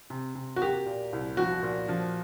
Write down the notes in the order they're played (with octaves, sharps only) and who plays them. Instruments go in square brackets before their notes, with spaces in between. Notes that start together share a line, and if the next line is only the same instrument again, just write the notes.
[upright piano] C3
C3
[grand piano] F#4
[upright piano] A#3 [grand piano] G4
[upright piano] A#2
C2
[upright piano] F3 [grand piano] F#4
[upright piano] A#2
F3